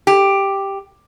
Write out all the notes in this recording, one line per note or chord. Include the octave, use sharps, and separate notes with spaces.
G4